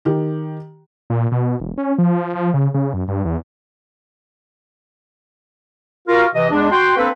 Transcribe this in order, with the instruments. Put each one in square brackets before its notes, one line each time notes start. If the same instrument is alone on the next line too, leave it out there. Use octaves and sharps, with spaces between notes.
[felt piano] D#3 G4
[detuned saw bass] A#2
B2
E1
C#4
F3
F3
C#3
C#3
F#2
G2
E2
[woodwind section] F4 F#4 A#4
C3 E3 D#5
E2 G#3 D4
F#4 G5 C6
A#3 C4 D4 A4 B4